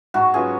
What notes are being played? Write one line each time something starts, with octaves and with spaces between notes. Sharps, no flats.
G#2 F#4
F#3 C#4 F4 G#4 B4